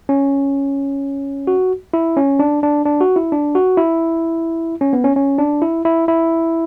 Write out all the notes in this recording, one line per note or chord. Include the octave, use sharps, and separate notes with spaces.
C#4
F#4
E4
C#4
D4
D4
D4
F#4
E4
D4
F#4
E4
C#4
B3
C#4
C#4
D4
E4
E4
E4